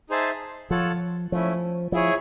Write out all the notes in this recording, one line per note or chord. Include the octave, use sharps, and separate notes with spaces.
D#4 G#4 C5 E5 A5
F3 F4 A4 C#5 F#5 A5
F3 A3 C#4 E4
F3 E4 G#4 C#5